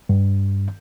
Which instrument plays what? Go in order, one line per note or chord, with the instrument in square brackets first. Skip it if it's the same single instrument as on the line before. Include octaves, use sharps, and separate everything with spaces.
[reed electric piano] G2